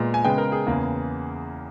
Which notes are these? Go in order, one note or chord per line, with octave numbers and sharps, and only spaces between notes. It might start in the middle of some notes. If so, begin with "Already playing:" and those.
Already playing: A#2 G#3 B3
G#5
C#3 G#3 B3 G5
A#4
G#4
E2 C#3 E3 A#3